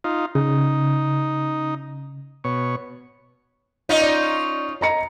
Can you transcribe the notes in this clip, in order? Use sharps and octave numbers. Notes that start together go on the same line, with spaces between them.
D#4 F4
C#3 D#4
B2 C#5
C#4 D#4 F4 D#5
D5
D#5 A#5 C#7